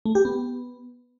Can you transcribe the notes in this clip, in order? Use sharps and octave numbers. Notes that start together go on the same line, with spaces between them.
A3
G4
B3